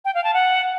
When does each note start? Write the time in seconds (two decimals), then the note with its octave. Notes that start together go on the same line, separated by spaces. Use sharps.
0.05 G5
0.15 F5
0.24 A5
0.34 F#5